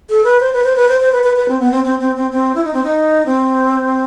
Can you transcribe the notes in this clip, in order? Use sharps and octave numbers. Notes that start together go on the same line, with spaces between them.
A4
B4
C5
B4
C5
B4
C5
C5
B4
B4
B4
C4
B3
C4
C4
C4
C4
C4
E4
D#4
C4
D#4
C4